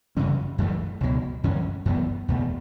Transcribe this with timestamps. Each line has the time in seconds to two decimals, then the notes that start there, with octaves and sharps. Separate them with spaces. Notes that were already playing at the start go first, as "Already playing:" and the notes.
0.17 F#2 C#3 E3 C#4
0.58 F#2 E3 A3
1.01 C#2 B2 F#3
1.44 F#2 E3 C#4
1.86 F#2 E3 B3
2.28 E2 B2 A3